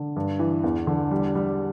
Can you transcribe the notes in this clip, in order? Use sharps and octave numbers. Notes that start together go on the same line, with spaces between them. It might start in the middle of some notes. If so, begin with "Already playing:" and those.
Already playing: D3
G2
E3
E2
D3
G3
G3